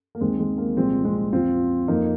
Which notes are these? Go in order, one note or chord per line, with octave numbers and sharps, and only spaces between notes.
A#3
D#2 D#3 G#3 C4
G#3
A#3
C2 A#2 F3 G#3 C4
G#3 C4
F2 F3 C4 F4
F2 F3 A#3 D#4